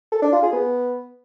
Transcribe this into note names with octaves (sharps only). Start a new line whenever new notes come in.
A4
D4
F4
G#4
B3